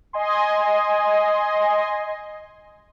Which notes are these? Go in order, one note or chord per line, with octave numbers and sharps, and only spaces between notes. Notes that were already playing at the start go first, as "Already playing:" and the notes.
D#5 G#5 C6